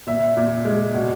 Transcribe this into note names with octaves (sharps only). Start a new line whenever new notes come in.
A#2 E5
A#2
G#3
B2